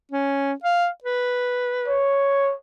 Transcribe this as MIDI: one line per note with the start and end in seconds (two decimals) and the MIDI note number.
0.11 0.53 61
0.64 0.88 77
1.04 2.06 71
1.88 2.53 73